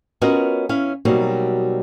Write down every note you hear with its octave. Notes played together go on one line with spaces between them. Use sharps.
B3 C#4 F4 F#4 A#4 D#5
C#4 E4 F5
B2 F#3 G3 A#3 C4 D#4